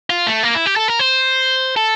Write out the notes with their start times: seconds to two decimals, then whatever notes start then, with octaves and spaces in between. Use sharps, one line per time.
0.10 F4
0.27 A3
0.43 A#3
0.55 E4
0.66 G4
0.76 A4
0.88 A#4
0.99 C5
1.77 A4